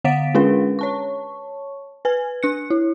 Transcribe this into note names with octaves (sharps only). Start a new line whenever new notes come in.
D3 F5 F#5 A6 B6 D7
G#3 C#4 D4 G#4 B4
C#5 A5 C#6
B4 G#5 G#6
D4 F#6 C#7
E4